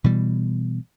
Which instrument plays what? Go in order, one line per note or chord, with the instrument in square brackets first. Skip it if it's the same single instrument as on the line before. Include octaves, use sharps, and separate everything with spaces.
[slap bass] B2 E3 G3